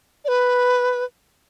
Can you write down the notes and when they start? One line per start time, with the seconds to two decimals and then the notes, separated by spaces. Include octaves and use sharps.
0.25 D5
0.28 B4